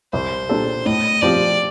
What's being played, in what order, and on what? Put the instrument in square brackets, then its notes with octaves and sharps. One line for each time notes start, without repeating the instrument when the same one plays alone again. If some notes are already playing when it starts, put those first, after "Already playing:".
[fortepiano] C2 [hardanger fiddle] C5
[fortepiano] A#2 G3 D4 A4
[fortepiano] A2 [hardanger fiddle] D#5
[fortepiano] F3 C4 G4 [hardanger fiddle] D5